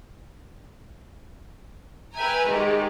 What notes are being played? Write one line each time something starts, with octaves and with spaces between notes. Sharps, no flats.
B4 E5 G5 G#5 A#5
G#2 D#3 G#3 G4